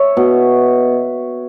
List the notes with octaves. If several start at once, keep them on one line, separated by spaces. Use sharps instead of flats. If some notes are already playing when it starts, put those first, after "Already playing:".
Already playing: C#5 E5
B2